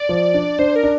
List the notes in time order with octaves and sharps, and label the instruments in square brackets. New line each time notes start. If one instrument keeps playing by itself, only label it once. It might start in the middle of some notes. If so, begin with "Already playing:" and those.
Already playing: [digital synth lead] D5
[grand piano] F3
D4
[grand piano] D4 [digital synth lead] C5
[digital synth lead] A#4
[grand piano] D4